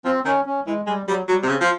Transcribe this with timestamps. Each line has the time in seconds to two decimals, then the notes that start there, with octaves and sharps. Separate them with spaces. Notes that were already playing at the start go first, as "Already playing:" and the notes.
0.05 F3 C4
0.25 D#3 C#4
0.46 C#4
0.67 E3 G#3
0.87 G3 G#3
1.07 F#3 G3
1.28 F#3 G3
1.43 C3
1.48 C#3 C4
1.61 F3